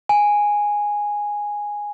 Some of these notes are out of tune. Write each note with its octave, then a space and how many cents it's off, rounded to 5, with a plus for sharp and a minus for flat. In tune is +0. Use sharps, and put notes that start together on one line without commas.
G#5 -5